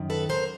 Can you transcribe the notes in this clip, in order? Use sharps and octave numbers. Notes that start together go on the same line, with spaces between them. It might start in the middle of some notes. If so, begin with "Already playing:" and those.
Already playing: F#2 D#3
A4 B4
F#2 A#4 C5